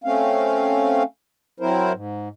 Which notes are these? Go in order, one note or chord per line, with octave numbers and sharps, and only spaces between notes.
A3 C4 C#4 F5
F#3 C4 E4 A#4 C5
G#2